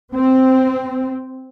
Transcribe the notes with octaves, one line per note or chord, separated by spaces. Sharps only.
C4